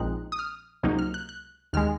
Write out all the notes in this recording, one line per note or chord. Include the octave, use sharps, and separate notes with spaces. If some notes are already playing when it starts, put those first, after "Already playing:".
Already playing: A#1 A#2 G#3 C4 D#4 F#6
D#6
F6
C#2 C3 F#3 A#3 D#4
F6
F#6
F#6
D#2 D#3 G#3 F6